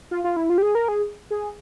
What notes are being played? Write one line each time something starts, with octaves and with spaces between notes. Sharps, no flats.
F4
F4
E4
F4
G4
G#4
A#4
G#4
G#4